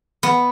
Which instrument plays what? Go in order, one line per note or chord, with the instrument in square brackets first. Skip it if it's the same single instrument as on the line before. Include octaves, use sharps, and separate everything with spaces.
[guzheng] B3